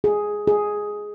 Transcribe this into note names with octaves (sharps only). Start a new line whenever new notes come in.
G#4
G#4